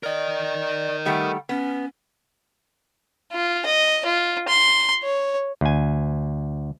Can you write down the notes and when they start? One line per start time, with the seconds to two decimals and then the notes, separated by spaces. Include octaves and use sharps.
0.03 A#4 D5 D#5
1.05 D#3 G3 A3 F#5
1.49 B3 C#4
3.32 F4
3.66 D#5
4.06 F4
4.49 C6
5.03 C#5
5.61 D2 G#5